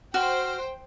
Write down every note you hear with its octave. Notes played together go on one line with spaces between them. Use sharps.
F#4 C5 G5 F6